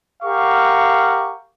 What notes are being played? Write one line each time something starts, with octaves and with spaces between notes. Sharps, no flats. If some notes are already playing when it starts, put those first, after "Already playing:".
G4 A#4 F5 F#5 C#6